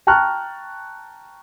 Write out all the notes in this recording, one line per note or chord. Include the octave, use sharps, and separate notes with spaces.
G5 A5 A#5 C#6 F6 F#6